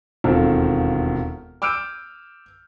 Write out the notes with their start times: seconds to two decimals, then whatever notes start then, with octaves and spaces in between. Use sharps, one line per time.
0.24 E1 D#2 C4 F4 A4 F6
1.62 D6 E6 F6 G6 D7 D#7